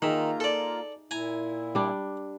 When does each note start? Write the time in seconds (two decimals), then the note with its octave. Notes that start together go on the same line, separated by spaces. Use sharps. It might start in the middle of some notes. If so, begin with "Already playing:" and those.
0.02 D#3 A#3 D#4 F4 G#4 E5 A#5
0.40 A4 D5
1.11 A#2 E4 G#5 A#5
1.75 G3 D4